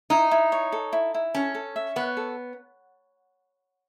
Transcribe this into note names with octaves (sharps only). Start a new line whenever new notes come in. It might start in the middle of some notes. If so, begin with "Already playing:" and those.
D#4 E4
E4
C#5
A4
E4
E4
C#4 A4
A4
E5
B3 C#5
A4